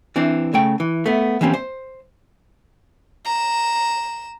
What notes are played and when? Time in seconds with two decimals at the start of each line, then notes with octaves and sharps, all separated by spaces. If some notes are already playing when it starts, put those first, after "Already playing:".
0.16 E3 C4 D4
0.54 C#3 A3 G5
0.80 E3
1.06 A3 B3
1.41 E3 G3 A#3 C4 C#4
1.54 C5
3.25 A#5 E7